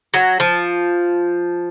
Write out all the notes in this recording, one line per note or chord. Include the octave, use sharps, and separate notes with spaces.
F#3
F3